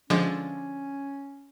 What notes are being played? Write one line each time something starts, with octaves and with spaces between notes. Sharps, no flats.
D3 F3 G#3 C#4